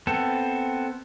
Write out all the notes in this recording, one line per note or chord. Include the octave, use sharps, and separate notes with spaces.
B3 C4 A4